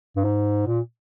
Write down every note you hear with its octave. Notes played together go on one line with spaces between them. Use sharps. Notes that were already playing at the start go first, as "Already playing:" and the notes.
G2
G#2
A#2